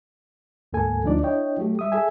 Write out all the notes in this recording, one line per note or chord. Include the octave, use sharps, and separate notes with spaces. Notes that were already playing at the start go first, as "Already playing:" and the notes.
D2 G#2 A#3 A4 G#5
D2 F3 D4 D#4 D5
D4 E4 C#5 D#5 G5
F#3 A3 G4
G3 E5 D#6
G#4 A4 E5 G#5